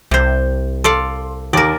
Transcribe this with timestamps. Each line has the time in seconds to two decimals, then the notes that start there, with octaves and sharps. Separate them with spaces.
0.11 C2 C3 C5
0.84 A4 D5 F5 C6
1.53 D#2 A#4 D5